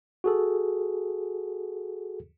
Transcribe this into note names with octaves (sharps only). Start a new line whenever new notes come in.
F#4 G#4 A4